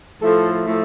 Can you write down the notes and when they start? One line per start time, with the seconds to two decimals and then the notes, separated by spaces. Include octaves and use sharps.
0.21 A2 F3 A3 A4
0.66 A2 F3 A3